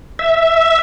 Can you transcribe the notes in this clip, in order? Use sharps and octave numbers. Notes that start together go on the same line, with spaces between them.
E5